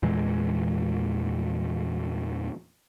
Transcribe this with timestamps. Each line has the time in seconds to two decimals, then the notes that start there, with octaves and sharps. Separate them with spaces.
0.03 E2 A#2 E3 G#3